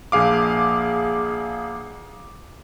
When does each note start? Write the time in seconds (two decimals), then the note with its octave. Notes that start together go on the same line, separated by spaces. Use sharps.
0.12 A#1 G#4 F5 D6